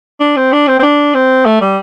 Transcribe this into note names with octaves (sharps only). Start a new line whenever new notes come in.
D4
C4
D4
C4
C4
D4
C4
A3
G3